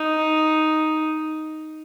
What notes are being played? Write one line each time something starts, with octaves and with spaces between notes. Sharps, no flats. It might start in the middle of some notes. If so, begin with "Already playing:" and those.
Already playing: D#4